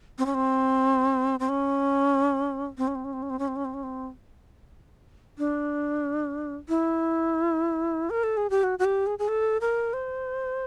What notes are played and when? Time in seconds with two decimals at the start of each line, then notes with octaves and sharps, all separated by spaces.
0.18 C4
0.26 C#4
0.34 C4
1.40 C4
1.49 C#4
2.78 C4
2.87 C#4
2.95 C4
3.04 C#4
3.13 C4
3.23 C#4
3.30 C4
3.39 C#4
3.48 C4
3.56 C#4
3.65 C4
3.74 C#4
3.83 C4
5.38 D4
6.69 E4
8.10 A#4
8.23 A4
8.37 G#4
8.50 G4
8.63 F#4
8.79 F#4
8.85 G4
9.07 G#4
9.19 G#4
9.28 A4
9.61 A#4
9.93 C5